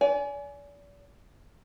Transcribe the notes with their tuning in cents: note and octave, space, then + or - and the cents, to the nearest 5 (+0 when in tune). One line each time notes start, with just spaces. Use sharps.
D5 -40 G#5 +10